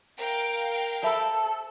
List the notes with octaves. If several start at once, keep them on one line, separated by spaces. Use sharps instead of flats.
A#4 F5 G5
A4 C5 E5 B5